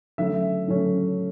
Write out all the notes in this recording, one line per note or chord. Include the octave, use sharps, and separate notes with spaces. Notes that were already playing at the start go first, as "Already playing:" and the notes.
D3 F#3 A3 C#4 E5
D3 F#3 A3 C#4